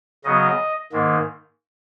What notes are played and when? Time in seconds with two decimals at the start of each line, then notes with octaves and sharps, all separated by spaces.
0.24 C#3 F#3 B3 D#5
0.92 G#2 D#3 A#3